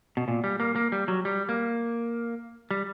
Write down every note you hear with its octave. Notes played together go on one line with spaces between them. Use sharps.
B2
A#2
G3
A#3
A#3
G3
F#3
G3
A#3
G3